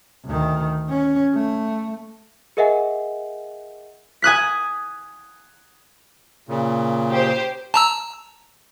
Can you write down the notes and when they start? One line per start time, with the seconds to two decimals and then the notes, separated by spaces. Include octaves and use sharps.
0.25 D2 D#3
0.89 C#4
1.34 A3
2.57 G#4 A#4 D#5 E5 F#5 G#5
4.22 G#5 D#6 F#6 B6
6.49 A#2 C#3
7.11 G4 C5
7.74 A5 A#5 E6